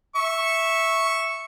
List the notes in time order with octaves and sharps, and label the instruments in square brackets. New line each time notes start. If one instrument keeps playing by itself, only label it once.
[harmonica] E5 C#6